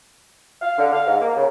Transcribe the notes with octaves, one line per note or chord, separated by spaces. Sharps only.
F5
D3
F5
G#2
A#3
C#3